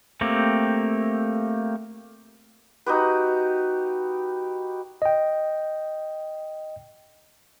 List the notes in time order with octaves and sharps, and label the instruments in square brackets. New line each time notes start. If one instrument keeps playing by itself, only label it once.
[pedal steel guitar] A3 A#3 C4 G4
[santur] D#4 F#4 G4 B4
[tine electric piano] D#5 G5